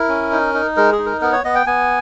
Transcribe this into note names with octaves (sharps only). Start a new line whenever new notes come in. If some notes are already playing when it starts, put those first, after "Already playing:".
Already playing: E4 A#4
C#4
D#4
D#4
G#3 A#4
G#4
D#4
A#4
B3 A#4
C#5
B3 D#5
G5
B3 G#5